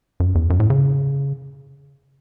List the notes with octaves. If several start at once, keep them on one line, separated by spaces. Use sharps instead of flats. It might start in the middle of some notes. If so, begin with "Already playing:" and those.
F#2
E2
F#2
A2
C#3